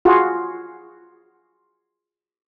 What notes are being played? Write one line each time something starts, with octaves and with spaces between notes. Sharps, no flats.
F4 F#4 G#4